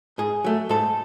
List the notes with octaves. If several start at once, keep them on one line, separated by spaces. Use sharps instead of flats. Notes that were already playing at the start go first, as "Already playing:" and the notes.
G#2 G#4
F#3 A3
G#2 A4